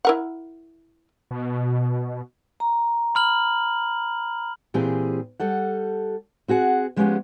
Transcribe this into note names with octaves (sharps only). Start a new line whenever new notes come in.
E4 A#4 F#5
B2
A#5
B5 F6 F#7
A#2 E3 C4 G4 G#4
G3 A4 F#5
C4 F#4 G#4 F#5
F3 G#3 B3 C#4 G4 F#5